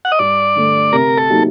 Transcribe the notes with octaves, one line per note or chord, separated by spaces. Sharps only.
F#5
D#5
G2 D5
D3 A3
C3 A#4
A4
F#3 A#3 D#4 G4